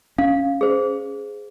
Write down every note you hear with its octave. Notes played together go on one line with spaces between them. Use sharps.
C#4 F5
G#4 C5